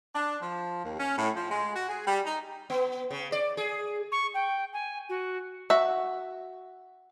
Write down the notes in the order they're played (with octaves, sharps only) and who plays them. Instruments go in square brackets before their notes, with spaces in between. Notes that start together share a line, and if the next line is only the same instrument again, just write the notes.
[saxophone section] D4
F3
D#2
C#4
A2
F3
G#3
F#4
G#4
G3
D#4
[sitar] B3
C#3
D5
G#4
[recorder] C#6
G5
G#5
F#4
[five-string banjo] F#4 E5